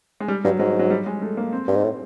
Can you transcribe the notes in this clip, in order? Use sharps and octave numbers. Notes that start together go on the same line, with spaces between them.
G#3
G3
G2 F#3
G#2 F#3
F#3
G3
G#3
A3
A#3
C4
G2
G#2
A2